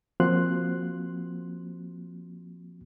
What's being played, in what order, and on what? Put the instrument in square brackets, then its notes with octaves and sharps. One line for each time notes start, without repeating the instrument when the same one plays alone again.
[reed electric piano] F3 A#3 C4 F#4 C6 F#6